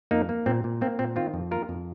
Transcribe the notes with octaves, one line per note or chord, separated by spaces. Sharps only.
F2 A#3 D#4
A#3
A#2 C4
A#2
A#3 C4
A#2 C4
D#3 C4 F4
F2
A#3 F4 A#4
F2